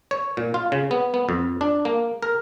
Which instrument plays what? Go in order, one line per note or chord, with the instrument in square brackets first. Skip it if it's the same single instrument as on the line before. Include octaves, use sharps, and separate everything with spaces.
[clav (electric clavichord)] C#5
A#2
F4
C#3
B3
B3
F2
D4
A#3
A#4